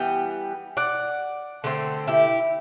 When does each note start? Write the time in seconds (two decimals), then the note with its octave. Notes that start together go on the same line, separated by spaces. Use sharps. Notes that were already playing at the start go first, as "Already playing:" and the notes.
Already playing: E3 G3 B3 G5
0.77 D5 F#5
1.64 D3 A3 C4
2.07 E4 G4